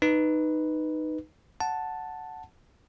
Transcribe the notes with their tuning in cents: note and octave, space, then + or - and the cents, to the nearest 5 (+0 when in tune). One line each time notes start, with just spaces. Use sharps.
D#4 -10 B4 +0
F#5 +0 A5 +0